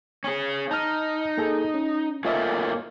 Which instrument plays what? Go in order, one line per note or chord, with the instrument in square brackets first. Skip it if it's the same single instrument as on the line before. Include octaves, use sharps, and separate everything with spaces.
[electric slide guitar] C#4 G#4
[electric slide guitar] D#4 [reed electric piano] A5 F6
[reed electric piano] A#3 G#4 A4
C#4
[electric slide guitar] A3 A#3 C#4 [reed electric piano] F4 D#5 E5